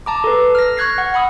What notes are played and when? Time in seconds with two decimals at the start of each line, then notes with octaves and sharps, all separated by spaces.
0.06 A5 A#5 D6
0.24 A4 B4
0.55 F6 A#6
0.77 C#6 F6 F#6 G#6 A#6 C7
0.98 F#5
1.14 F#5 B5 D#6 E6